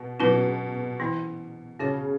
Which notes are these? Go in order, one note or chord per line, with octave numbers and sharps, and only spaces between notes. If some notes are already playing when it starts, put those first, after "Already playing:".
Already playing: B2
B2 F#3 C#4 F#4 B4
E3 B3 E4
C#3 C#4 F#4 C#5